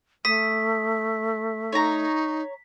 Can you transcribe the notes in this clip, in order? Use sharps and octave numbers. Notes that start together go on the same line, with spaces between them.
A3 D#6 B6
D#4 C#5 A#5